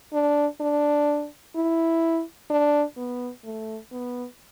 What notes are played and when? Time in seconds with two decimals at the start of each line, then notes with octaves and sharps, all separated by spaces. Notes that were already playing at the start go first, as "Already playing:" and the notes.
0.13 D4
0.61 D4
1.56 E4
2.50 D4
2.97 B3
3.45 A3
3.92 B3